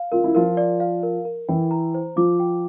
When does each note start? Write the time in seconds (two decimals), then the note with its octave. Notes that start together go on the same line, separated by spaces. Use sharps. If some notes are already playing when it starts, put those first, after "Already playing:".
Already playing: F5
0.12 F4 A#4
0.24 E4
0.35 F3 F4 A#4
0.57 D5
0.80 F5
1.03 A#4
1.25 A#4
1.48 E3 E4 G5
1.71 A#5
1.94 C5
2.16 F3 F4 D6
2.40 G5